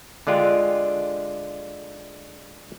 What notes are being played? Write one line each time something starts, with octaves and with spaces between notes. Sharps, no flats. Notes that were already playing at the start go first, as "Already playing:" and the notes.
D3 G#3 D4 F4 G4